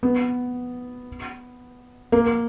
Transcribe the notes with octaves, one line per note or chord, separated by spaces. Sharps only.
B3
A#3